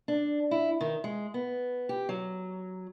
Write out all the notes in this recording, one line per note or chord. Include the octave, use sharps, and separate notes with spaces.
D4
E4
D#3
G#3
B3
G4
F#3